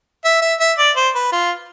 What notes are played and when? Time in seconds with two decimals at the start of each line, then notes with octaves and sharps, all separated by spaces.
0.25 E5
0.42 E5
0.60 E5
0.78 D5
0.96 C5
1.15 B4
1.32 F4